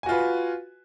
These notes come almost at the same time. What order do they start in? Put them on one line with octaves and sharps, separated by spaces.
G#5 F#4 F4 B4